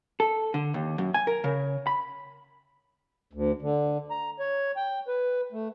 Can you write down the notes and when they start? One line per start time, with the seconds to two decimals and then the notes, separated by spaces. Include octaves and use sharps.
0.20 A4
0.54 D3
0.74 D#2
0.98 F#2
1.14 G#5
1.27 A#4
1.44 C#3
1.87 B5
3.33 D2
3.62 D3
4.11 A#5
4.40 C#5
4.77 G5
5.08 B4
5.52 A3